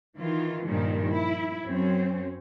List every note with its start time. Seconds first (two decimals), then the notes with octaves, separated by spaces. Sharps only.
0.17 D#3 E3 F4
0.68 G2 A#2 D#3 F3 G3
1.10 E4
1.65 F#2 C4 C#4